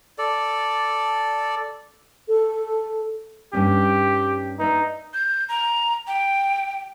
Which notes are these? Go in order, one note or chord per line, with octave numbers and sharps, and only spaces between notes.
A4 D5
A4
G2 C#4 D#4 G4
D#4 B4 D5 E5
G6
A#5
G5